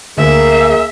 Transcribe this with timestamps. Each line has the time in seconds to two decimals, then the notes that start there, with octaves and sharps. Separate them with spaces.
0.18 D2 A#3 G#4 E5